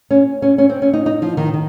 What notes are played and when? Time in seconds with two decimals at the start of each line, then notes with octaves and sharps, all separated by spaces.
0.11 C#4
0.42 C#4
0.58 C#4
0.70 C4
0.82 C#4
0.93 D#4
1.06 D#4
1.22 F3
1.37 D#3
1.53 D#3